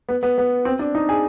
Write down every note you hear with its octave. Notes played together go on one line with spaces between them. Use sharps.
B3
B3
B3
C4
D4
D#4
G#4